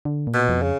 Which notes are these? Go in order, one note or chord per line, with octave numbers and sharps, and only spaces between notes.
D3
A#2
B2
F2
C#3